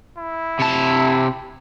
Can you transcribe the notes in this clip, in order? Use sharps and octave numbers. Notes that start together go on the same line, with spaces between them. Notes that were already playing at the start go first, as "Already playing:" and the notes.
E4
C3 A5